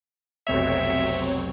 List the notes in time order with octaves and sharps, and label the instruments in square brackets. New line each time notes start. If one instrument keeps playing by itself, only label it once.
[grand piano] F1 B1 F7 [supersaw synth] F#3 C4 C#5 [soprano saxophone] E5